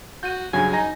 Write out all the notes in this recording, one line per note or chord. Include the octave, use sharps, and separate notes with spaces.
F#4 G6 D#7
G2 C#3 F#3 G#5
D#4 G#5 A#5 A#6